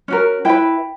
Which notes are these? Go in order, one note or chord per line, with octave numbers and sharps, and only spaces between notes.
C#4 F#4 A#4
E4 B4 G5